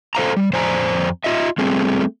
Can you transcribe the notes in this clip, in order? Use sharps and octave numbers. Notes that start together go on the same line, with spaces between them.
A4 C5 F5 A#5
G3
F2 C5 D5 G#5 A#5
F4 D#5 E5
G3 A3 B3 C4 G#4